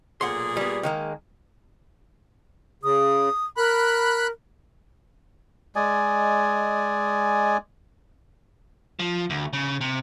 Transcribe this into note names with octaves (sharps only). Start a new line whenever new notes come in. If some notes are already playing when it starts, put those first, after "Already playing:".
B1 A#2 G#4 F#5 C6
G3 B3
D#3 G#3 A#3
C#3 D#6
A#4 B5 F#6
G#3 D5 D#5 G#5
F3
D2
C#3
C3